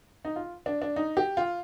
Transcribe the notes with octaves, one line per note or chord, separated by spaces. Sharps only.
D#4
F4
D4
D4
D#4
G4
F4